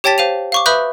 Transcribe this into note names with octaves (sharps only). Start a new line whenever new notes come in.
G4 C#5 G5 A5 A6 B6
C5 F5 D#7 F7
F5 C#6 D6
B4 E5 B5 D#6 F#6 G6